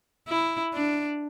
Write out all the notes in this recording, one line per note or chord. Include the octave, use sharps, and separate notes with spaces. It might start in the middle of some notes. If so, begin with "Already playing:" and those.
E4
D4